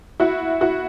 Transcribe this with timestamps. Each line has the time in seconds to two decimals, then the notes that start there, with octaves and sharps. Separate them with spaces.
0.20 E4 F#4
0.61 E4 F#4